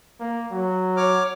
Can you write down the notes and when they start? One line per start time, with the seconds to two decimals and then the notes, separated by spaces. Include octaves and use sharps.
0.20 A#3
0.51 F#3
0.97 C#5 D6 F6